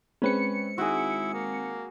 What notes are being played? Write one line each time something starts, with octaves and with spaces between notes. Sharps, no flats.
G#3 C4 C#4 B4 C#5 C#7
D#3 E4 F#4 G#4
A#3